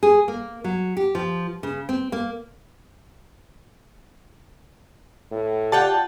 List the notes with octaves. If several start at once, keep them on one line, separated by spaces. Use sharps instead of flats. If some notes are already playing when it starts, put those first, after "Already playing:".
G#4
A#3
F#3
G4
F3
C#3
C4
A#3
A2
F4 G4 D5 F#5 G5 A5